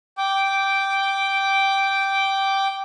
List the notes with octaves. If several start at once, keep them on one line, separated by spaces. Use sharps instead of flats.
G5 D6